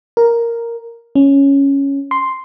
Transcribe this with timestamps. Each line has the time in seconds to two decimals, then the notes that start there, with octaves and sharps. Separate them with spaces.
0.17 A#4
1.15 C#4
2.11 C6